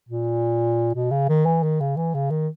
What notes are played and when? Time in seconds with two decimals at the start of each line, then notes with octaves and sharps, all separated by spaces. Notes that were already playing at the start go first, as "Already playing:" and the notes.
0.09 A#2
0.94 B2
1.11 C#3
1.29 D#3
1.46 E3
1.63 D#3
1.80 C#3
1.97 E3
2.14 C#3
2.31 D#3